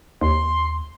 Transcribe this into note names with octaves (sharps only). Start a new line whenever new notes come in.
D#2 C6